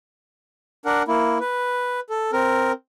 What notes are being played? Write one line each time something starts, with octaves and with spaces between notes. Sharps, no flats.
D4 A#4 F#5
A#3 E4
B4
A4
C4 A#4